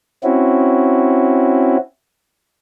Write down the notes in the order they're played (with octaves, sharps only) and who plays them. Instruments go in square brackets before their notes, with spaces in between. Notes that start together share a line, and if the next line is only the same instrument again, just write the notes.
[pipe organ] C4 C#4 E4 F#4